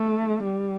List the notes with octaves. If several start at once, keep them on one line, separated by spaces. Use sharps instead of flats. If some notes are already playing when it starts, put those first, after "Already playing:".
Already playing: A3
G3